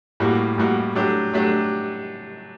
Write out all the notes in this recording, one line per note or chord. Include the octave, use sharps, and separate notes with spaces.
A2 G3 A#3 F#4
A2 G3 A#3 F#4
F#3 A3 D4 G4
F#3 A3 D4 G4